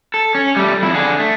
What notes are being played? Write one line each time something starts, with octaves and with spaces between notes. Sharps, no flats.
A4
C#4
G3 A3
F2 E4
D3 G#4
A3